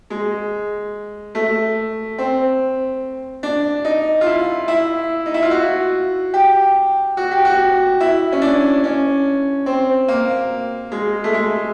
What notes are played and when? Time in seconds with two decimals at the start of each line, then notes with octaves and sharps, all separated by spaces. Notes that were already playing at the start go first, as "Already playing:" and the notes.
0.10 G#3
1.35 A3
2.18 C4
3.43 D4
3.85 D#4
4.21 F4
4.27 E4
4.68 E4
5.26 D#4
5.34 E4
5.43 F4
5.51 F#4
6.34 G4
7.17 F#4
7.31 G4
7.45 F#4
8.01 E4
8.32 C#4
8.42 D4
8.84 C#4
9.66 C4
10.08 A#3
10.92 G#3
11.24 A3
11.34 G#3